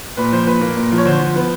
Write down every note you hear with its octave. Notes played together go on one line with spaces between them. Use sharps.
A#2 B4
F3 C5
A#2 B4
A#3
A#2
F3
C#5
D3 C5
F3
B3